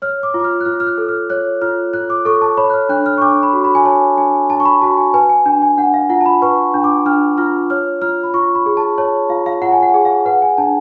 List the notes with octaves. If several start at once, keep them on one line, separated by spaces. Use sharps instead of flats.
C#5 F6
D6
F4
D6
F6
F#6
F4 F6
F6
F#6
A4
F6
C#5 F#6
F4 F6
F4 F#6
D6
A4 C#6
A5
C#5 B5
F#6
F6
D4 F#6
F6
C#6
D4 D6
B5
F#4
B5
G#5
C#5 A5
D4 G#5
D4 A5
C#6
B5
F#4 A5
G#5
B4 G#5
G#5
D4 G#5
G#5
D4 F#5
F5
F4 F#5
A5
B5
B4 C#6
D4
D6
D4 F6
F4 F6
C#5 F6
F4 F6
B5
F4 C#6
B5
G#4
A5
C#5 A5
F4 F5
F5
F4 F#5
G#5
F#5
G#4
F5
B4 F#5
G#5
D4 A5